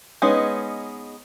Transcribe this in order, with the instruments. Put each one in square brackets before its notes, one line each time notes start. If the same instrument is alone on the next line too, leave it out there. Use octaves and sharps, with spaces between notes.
[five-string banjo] G#3 B3 C#4 D#4